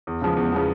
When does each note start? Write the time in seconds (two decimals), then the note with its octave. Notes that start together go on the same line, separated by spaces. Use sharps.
0.07 E2
0.22 C#3 F3 G#3 B3
0.37 E2
0.52 C#3 F3 G#3 B3